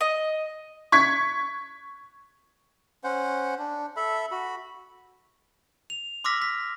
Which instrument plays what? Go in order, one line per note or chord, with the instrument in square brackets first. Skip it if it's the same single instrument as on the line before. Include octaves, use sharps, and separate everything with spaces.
[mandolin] D#5
[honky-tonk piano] C#6 G#6 B6
[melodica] C#4 C5 F#5
D4
A4 E5 B5
F#4 B5
[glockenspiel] F7
C6 D6 E6 F6 A#6 B6
B6